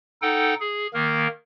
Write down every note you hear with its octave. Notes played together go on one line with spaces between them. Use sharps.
D#4 A4 F#5 G5
G#4
D#3 A#3 A#4